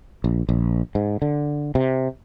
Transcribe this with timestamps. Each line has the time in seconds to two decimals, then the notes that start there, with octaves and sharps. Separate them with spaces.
0.24 A#1
0.49 A#1
0.95 G#2
1.22 D3
1.75 C3